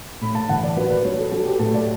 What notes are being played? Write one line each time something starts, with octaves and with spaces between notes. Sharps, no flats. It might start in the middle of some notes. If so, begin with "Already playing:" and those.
A2 B5
A5
E3 F#5
D5
F#3 B4
B4
F#3 C#5
A4
F#3 A4
G4
A2 A4
D5